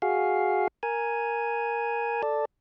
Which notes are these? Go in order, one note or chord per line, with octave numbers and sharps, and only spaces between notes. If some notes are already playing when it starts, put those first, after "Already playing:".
F#4 G#4 F5
A#4 G#5
A4 D5